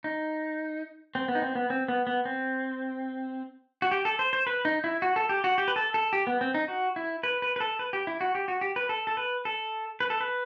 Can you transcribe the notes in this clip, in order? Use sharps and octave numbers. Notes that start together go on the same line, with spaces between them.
D#4
C4
B3
D#4
C4
B3
C4
B3
B3
C4
F#4
G4
A4
C5
C5
B4
D#4
E4
F#4
A4
G4
F#4
G4
B4
A4
A4
G4
B3
C4
D#4
F#4
E4
B4
B4
B4
A4
B4
G4
E4
F#4
G4
F#4
G4
B4
A4
A4
B4
A4
B4
A4
B4